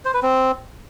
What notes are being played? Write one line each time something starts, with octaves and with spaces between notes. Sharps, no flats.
C5
B4
C4